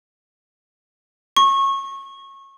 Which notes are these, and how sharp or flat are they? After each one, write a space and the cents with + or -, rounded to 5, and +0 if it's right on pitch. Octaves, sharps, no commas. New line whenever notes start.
C#6 -20